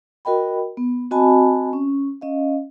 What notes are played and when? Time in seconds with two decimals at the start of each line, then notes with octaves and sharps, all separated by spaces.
0.25 F#4 A#4 D#5 G5 B5
0.77 B3
1.11 C4 F#4 D#5 G#5 A5 B5
1.73 C#4
2.21 C#4 D#5 F5